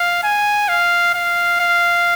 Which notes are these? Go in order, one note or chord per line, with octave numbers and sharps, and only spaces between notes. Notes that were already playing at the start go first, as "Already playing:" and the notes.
Already playing: F5
G#5
F5
F5
F5